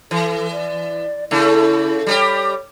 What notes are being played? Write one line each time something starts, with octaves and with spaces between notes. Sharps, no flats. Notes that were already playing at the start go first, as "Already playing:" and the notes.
E3 A4
D5
C#3 A3 E4
G3 G#3 G4 C#5